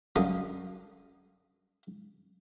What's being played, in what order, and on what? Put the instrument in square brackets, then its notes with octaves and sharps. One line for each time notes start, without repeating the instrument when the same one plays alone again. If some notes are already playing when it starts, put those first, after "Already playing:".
[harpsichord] F#2 D3 G3 D#5 F5 D#6